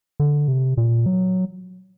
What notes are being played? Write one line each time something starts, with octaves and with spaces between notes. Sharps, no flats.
D3
C3
A#2
F#3